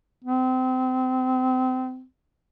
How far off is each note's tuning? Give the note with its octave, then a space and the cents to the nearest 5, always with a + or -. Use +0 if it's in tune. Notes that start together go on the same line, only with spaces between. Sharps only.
C4 -30